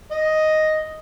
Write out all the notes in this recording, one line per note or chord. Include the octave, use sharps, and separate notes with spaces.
D#5